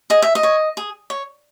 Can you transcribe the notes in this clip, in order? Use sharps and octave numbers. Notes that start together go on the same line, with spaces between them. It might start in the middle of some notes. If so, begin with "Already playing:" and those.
G#4 D#5
E5
D#5
C#5
G#4
C#5